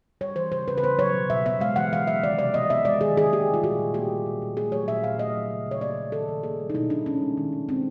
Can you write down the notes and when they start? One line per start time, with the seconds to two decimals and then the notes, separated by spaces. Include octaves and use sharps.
0.21 G3 C#5
0.36 E3 C5
0.52 C#3 C5
0.68 C#3 B4
0.78 B4
0.83 B3 C5
0.99 F#3 C#5
1.14 B2
1.30 B2 E5
1.46 B3 E5
1.60 G#3 F5
1.76 E3 F#5
1.92 E3 F5
2.07 F#3 E5
2.23 D#3 D5
2.39 C3 D5
2.54 B3 D#5
2.70 B3 E5
2.85 G#3 D5
3.01 D#3 G#4
3.16 D#3 G#4
3.32 A#3 G4
3.48 G3
3.54 F4
3.63 A#2 F#4
3.79 A#2
3.94 A#3 G4
4.10 G3
4.26 A#2
4.42 A#2
4.57 A3 G#4
4.72 F#3 C#5
4.88 A#2 E5
5.04 A#2 F5
5.19 A3 D#5
5.35 F#3
5.50 C#3
5.66 C#3 C#5
5.81 A#3 D5
5.98 F#3
6.12 D#3 A4
6.28 D#3
6.43 A#3 G#4
6.60 G3
6.70 D#4
6.75 B2 E4
6.90 B2 D4
7.06 B3 C#4
7.22 G#3
7.37 D#3
7.53 D#3
7.69 G#3 C4